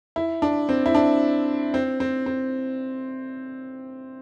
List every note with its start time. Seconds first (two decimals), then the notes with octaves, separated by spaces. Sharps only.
0.16 E4
0.42 D4
0.69 C4
0.86 E4
0.95 D4
1.74 C4
2.00 C4
2.26 C4